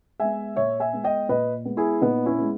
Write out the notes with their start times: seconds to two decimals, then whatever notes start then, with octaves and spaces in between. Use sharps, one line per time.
0.20 G#3 B3 E5 G#5
0.56 A#2 C#5 E5
0.80 E5 G#5
0.93 G#3 B3
1.04 D#5 G5
1.29 A#2 B4 D#5
1.65 G#3 B3
1.77 E4 G#4
2.01 A#2 B3 D#4
2.26 C#4 E4
2.38 G#3 B3